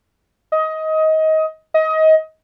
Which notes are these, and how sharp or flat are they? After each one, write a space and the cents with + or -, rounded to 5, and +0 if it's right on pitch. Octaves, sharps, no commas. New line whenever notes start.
D#5 +20
D#5 +25